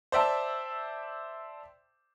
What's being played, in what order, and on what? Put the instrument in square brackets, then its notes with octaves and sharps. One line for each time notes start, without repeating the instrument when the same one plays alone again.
[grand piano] C5 D5 E5 G5 A5